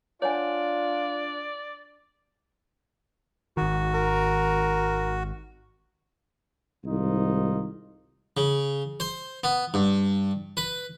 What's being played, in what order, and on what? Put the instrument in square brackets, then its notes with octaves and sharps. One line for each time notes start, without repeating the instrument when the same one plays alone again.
[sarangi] D4 [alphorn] F4 [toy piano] C#5 F#5 G#5 [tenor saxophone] D5
[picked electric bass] G#1 D#3 [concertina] F#4
[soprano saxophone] A#4
[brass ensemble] C2 G#2 D#3 D#4 F4
[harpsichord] C#3
C5
B3
G2
B4